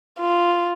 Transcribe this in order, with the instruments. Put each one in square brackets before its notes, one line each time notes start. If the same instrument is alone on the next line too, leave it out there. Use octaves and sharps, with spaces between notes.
[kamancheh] F4